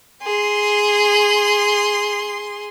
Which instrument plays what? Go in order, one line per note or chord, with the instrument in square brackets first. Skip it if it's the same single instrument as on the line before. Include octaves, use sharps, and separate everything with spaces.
[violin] G#4 C6